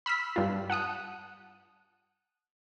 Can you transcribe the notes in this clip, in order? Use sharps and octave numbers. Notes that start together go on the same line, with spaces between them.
B5 E6 F6 B6
G2 F4
F#5 A5 D#6 F#6